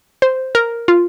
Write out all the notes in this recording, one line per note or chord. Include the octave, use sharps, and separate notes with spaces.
C5
A#4
F4